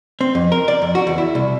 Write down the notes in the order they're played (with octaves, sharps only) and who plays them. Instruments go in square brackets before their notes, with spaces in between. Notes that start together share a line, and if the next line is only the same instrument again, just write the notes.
[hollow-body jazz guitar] C4
F2
A#4
D5
F2
F#4
E2
E4
C2